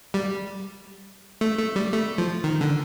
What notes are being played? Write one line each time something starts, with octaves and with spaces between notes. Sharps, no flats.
G3
A3
A3
G3
A3
F3
D#3
D3